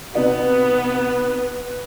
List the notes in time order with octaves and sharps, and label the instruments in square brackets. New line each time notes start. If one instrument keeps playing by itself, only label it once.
[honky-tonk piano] C3 D#4 F#4 [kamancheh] B3 [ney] B4